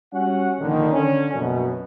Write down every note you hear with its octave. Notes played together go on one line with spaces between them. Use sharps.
G3 C#4 F#4 F#5
A#1 D3 D#3
D3 C#4
A#1 F#2 B2